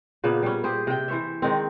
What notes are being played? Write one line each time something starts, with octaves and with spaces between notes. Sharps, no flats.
A#2 C#3 A#3 B3
G3 C#4
G4 G#4 C5
C3 G5
E3 C5 C#5 E5
D#3 G#3 C4